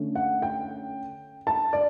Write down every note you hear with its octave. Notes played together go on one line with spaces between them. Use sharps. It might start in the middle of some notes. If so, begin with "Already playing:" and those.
Already playing: D3 A3 C#4
F#5
G5
A5
D5